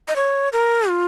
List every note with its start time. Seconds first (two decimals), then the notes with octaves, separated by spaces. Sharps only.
0.08 D#5
0.16 C#5
0.53 A#4
0.89 F4